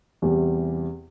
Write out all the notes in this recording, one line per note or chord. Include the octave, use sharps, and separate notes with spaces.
E2 C3 E3 G3